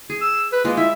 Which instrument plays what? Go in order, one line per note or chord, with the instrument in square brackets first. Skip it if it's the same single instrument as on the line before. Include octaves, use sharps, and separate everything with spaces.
[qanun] G#4
[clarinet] E6
B4
[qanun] G#3 F4 [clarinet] A#3
[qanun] E4 [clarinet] E5